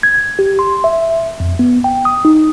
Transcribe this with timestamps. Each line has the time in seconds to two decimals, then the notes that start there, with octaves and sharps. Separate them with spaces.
0.03 G#6
0.39 G4
0.59 C6
0.84 E5
1.40 F2
1.59 B3
1.84 G5
2.05 D#6
2.25 D#4